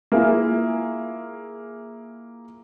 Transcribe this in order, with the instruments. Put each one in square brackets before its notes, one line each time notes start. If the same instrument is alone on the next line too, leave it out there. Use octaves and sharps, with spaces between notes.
[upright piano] A#3 E4 F4 G#4